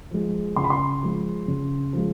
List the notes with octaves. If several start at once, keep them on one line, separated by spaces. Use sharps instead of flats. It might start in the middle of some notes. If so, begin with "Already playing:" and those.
F3 G#3
C#3 C6
B5
C6
F3 G#3
C#3
F3 G#3